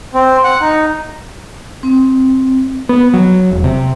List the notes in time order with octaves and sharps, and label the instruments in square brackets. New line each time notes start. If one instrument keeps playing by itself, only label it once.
[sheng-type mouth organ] C4
F#5
D#4
[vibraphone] C4
[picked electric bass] B3
F#3
E1
C3